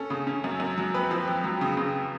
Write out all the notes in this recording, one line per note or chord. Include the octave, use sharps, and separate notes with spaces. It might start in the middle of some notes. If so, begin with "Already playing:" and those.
Already playing: C#4 A4
C#3
C#4
F#2
F#2
F#3
F2 B4
F3
F2
F#3
C#3
C#3